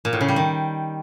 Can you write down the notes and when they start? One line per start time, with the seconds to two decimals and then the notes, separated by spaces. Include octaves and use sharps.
0.05 A#2
0.13 A2
0.21 C#3
0.28 G3
0.36 D#3